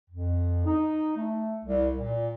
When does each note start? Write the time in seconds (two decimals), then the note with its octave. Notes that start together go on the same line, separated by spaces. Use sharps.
0.10 F2
0.65 D#4
1.17 A3
1.65 C2
1.98 A#2